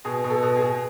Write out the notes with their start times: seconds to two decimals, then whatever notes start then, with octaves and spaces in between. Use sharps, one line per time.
0.05 B2 G#4
0.24 B2
0.30 A4
0.43 B2
0.56 G#4
0.61 B2